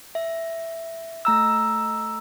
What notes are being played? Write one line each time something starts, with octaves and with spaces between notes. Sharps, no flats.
E5
A3 A#5 E6